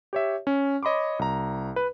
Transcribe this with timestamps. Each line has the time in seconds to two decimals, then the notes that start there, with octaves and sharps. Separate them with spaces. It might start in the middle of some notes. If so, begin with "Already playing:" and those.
0.13 G4 C#5 E5
0.47 C#4
0.83 C#5 D#5 B5 C6 D6
1.19 C2 A#5
1.76 B4